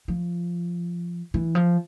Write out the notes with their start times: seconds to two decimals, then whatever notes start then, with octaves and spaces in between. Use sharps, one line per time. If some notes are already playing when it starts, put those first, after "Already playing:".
0.08 F3
1.34 E3
1.55 F3